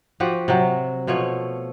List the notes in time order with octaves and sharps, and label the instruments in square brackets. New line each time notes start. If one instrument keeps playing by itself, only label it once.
[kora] F3 F#4 G4 F#5
C3 F#3
B2 F3 A3 C#5